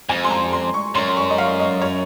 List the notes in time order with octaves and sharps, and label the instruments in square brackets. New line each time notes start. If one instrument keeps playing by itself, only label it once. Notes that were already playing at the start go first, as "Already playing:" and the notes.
[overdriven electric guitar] F2 [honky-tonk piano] G#5
[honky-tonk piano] C6
A#5
C6
C#6
[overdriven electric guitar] F#2 [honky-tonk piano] C6
[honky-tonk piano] C#6
D#5
F5
D#5
C#5